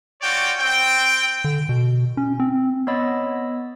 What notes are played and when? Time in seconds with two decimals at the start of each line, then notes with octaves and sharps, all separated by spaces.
0.22 F4 F#4 C#5 D5 G5
0.59 C4 G5
1.44 D3
1.69 B2
2.17 C#4
2.40 C4
2.87 B3 C#5 D#5 B5 E6 A6